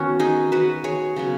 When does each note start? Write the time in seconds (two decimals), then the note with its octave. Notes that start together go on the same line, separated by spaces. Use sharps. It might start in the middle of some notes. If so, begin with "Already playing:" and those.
Already playing: D#3 B3 C#4 F#4
0.19 D#4 G#4
0.52 F#4 B4
0.84 G#4 C#5
1.16 C#3 F#3 B3